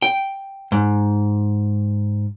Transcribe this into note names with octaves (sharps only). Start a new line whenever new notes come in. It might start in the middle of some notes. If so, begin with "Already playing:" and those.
G5
G#2